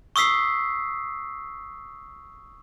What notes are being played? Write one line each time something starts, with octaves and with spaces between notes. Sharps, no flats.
C#6 D#6 E6 B6 C7